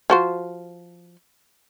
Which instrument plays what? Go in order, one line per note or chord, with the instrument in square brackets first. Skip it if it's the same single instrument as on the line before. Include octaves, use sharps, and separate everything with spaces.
[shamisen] F3 F#4 C5